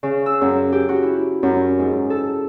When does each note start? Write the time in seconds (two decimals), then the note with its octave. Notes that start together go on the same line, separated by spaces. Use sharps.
0.03 C#3
0.26 E6
0.41 F#2
0.72 G4
0.89 F#4
1.02 E4
1.43 F#2
1.79 G#2
2.10 A4